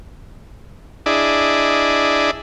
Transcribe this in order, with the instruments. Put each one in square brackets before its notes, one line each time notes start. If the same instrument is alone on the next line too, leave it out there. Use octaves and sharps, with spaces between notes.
[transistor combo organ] D4 E4 G#4 D5 D#5